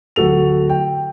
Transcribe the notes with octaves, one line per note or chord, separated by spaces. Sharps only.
D1 F#4 A4 F7
G5